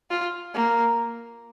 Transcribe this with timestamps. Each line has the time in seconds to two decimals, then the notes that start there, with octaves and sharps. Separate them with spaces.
0.10 F4
0.54 A#3